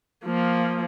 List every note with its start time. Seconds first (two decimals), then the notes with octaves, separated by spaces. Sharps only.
0.25 F3 A#3